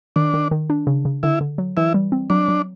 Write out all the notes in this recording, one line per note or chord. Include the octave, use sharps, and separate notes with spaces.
D#3 D4
D#3
D#3
D4
C#3
C#3
D3 E4
D3
F#3
E3 E4
G3
C4
F#3 D4
F#3